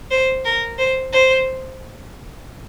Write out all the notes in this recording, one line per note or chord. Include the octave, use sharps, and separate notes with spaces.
C5
A#4
C5
C5